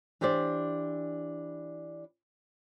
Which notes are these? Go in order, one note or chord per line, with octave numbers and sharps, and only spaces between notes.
E3 D4 G4 C5 D5